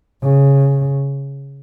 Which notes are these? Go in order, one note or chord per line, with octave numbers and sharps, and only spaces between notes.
C#3